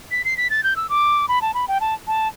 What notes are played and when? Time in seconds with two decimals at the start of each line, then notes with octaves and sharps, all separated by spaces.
0.11 B6
0.24 C7
0.37 B6
0.50 A6
0.63 G6
0.76 E6
0.89 D6
1.28 B5
1.42 A5
1.54 B5
1.68 G5
1.81 A5
2.07 A5